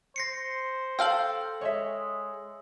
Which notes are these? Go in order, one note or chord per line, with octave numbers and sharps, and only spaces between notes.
C5 A#6 C7 C#7
A4 F5 G5 E6 F#7
G#3 C#5 D#5 E5